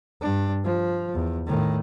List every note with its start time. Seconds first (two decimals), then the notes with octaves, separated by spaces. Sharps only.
0.21 G2 D4
0.64 F3
1.14 E2
1.46 A2 D#3